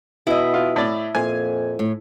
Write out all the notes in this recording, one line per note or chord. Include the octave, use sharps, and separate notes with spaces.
B2 E4 D#5
F4
A2 D5
F2 A#2 F4 G#5
A2